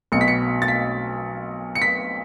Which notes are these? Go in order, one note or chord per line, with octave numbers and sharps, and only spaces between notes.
B1 B2 C#7
B6
C#7
A6
B6
C#7
B6